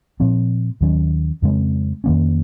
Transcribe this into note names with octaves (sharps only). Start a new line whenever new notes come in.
A#2 F3 C4
D#2 D#3 F#3 C#4
F2 C#3 G#3 C4
F2 D#3 A#3 C#4